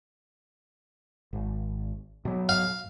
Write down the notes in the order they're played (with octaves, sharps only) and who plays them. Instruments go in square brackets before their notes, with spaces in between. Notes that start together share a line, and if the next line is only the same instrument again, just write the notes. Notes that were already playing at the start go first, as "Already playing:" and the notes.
[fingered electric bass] G#1
B2 F#3
[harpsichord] F5